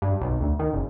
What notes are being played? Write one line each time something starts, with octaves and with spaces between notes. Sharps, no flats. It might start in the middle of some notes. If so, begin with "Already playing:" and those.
G2
B1
D2
D#3
F#1